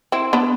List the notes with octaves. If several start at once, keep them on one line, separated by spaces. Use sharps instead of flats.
C4 E4
B3 D4